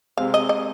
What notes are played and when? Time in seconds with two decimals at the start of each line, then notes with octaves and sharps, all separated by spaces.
0.17 C3 G#3 C4 F5
0.34 D#5
0.49 D#5